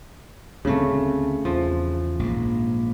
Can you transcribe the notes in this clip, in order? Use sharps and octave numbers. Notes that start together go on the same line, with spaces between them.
D2 C#3 A3 C4
E2 F3
A#1 G#2